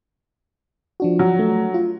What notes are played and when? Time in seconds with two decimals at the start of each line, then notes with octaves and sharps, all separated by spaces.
1.00 F3 D4 F#4
1.19 F#3
1.39 A3
1.74 F4